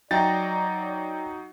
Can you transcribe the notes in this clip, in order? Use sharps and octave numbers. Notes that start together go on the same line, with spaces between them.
F#3 D#4 D5 G5 A#5 A6